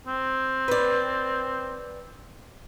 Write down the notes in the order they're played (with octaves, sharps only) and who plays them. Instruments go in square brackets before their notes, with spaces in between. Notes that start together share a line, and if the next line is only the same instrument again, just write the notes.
[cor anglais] C4
[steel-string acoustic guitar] B4 D5